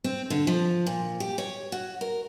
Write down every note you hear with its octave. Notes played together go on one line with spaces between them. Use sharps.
C4
D3
F3
A#2
G4
C#5
F#4
A#4